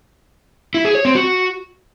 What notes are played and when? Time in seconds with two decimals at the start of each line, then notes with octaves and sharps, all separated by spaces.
0.74 E4
0.85 G#4
0.95 C#5
1.05 C4
1.15 F#4